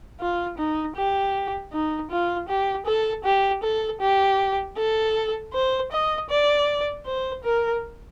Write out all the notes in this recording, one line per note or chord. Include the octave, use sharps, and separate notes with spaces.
F4
D#4
G4
D#4
F4
G4
A4
G4
A4
G4
A4
C5
D#5
D5
C5
A#4